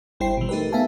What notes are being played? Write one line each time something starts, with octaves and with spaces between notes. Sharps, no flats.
G#1 G3 E4 C5 G5 C7
B2 E3
A3 D#4 G4 A#4 B4
A3 B3 E5 F5 G#5 A5